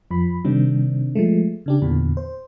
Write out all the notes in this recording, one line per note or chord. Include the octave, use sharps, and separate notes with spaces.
F2 F3 B5
C3 D#3 G3 C4 D4
F3 G#3 A3
C#3 D4 G4
E2 A#2 D3 E3
C5